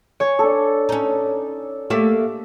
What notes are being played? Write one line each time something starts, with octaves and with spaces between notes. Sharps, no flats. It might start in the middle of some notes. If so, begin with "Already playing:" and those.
C#5 G#5
D4 A4
C#4 D#4
A3 A#3 G4 E5